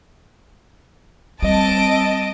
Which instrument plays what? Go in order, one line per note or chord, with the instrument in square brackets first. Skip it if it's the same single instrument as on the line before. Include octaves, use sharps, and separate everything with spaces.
[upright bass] G3 [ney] C4 [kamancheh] D#5 [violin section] A5 D7